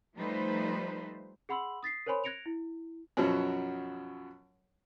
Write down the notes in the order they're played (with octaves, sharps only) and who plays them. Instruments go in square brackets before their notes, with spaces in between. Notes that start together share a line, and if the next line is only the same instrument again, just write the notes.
[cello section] F3 G3 A3 D#4 B4 C5
[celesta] G#4 F#5 B5 C6 E6 F#7
D#6 A6 B6 C7
A#4 C5 C#5 G#5 B5 C6
F#6 G#6 A#6 C#7 D7 F7
E4
[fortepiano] F#2 B2 F3 F#3